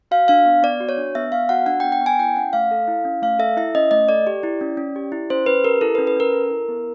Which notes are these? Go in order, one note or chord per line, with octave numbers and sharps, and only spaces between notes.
F#4 F5
D4 F5
B3
B3 D5
F#4
C#5
D4
B3 E5
B3 F5
F#4 F#5
D4 F#5
G5
B3
G5
B3
G#5
E4 G5
C#4 F#5
A3 F5
A4
E4
C#4
A3 F5
A4 E5
E4 E5
C#4 D#5
A3 D#5
A4 D5
G4
E4
C#4
C#4
G4
E4
C#4 C5
C#4 B4
G4 A#4
E4 A4
B4
C#4
B4
C#4 A#4
A4
E4
B3